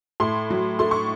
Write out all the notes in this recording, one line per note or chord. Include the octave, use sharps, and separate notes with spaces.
A2 C6
F#3
A3 C6
C#6